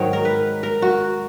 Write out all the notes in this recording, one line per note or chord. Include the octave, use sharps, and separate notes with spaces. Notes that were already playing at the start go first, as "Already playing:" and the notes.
Already playing: G#2 D#3 F#3 C#5 D#5
A#4
B4
A#4
F#4